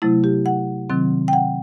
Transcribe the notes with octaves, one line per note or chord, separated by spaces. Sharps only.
C3 F#3 A3 E4
G4
F#5
C3 D#3 F#3 C4
G5
F#5